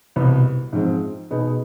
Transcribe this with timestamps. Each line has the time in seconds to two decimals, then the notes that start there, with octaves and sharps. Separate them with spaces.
0.16 C2 B2 B3
0.73 G#2 F3 G#3 C4
1.30 B2 B3 D#4 G#4